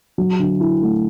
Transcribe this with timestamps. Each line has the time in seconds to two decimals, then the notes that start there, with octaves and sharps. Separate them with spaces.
0.18 F#3
0.39 D3
0.60 E4
0.81 A3